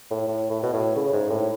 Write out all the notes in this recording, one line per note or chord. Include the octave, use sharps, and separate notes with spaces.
A2
A2
A2
B2
A2
C#3
G#2
A2